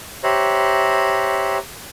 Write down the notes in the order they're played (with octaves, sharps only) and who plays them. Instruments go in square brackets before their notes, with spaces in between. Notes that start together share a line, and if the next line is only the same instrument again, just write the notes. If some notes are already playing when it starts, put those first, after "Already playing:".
[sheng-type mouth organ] G4 C5 C#5 E5 A#5 F#6